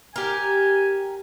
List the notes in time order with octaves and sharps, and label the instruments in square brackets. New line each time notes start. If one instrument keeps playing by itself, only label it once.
[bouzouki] G4 A#4 [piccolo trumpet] G#5